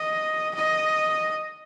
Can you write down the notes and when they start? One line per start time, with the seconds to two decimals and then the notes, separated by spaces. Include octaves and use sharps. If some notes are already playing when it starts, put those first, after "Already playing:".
Already playing: D#5
0.55 D#5